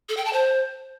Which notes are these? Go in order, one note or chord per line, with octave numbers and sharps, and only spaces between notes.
A4
G5
A5
C5